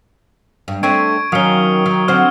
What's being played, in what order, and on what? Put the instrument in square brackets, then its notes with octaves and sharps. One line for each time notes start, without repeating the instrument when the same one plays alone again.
[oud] G2
[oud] A3 C4 D4 [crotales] C#6 G#6 D7
[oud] D#3 C#4 [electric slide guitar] F#3 F5 [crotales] D#6 C#7 G7
[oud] D#3
[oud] D3 C4 C5 [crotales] F6